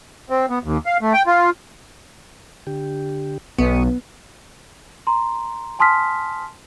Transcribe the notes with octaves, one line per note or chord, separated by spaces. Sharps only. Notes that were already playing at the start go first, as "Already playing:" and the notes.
C4
B3
D#2
F5
A3
G5
F4
D3 G4
B1 B3 F#4 C#6 D#6
A#5 C6
G#5 A5 C6 D#6 F6 B6